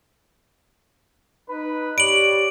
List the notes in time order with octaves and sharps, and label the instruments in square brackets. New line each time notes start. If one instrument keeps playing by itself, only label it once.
[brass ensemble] D#4 B4
[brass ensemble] G4 C#5 D5 [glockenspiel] D7 F#7